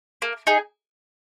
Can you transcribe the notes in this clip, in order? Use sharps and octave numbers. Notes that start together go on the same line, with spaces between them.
A#3
D#4 G#4